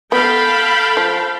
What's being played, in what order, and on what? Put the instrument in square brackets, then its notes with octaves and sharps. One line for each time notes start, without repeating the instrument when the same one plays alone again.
[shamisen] B3 [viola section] A4 F5 [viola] G5 A5 [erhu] B5
[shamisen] F3